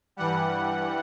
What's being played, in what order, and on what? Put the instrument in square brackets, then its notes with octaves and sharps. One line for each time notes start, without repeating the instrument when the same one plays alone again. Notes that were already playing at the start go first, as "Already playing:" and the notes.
[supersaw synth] G2 E3 G3 F#5